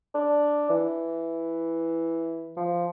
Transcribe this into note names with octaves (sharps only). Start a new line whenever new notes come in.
D4
E3
F3